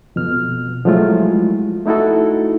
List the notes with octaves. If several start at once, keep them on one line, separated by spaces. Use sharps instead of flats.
F2 B2 F6
F3 F#3 G#3 A3 E4 F4
A3 D#4 E4 F#4 A4